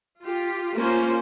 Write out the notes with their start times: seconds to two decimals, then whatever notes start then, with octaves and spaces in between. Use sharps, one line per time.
0.22 F4 G4
0.75 A#3 C#4 F4 C5